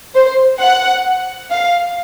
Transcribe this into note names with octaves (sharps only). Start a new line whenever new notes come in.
C5
F#5
F5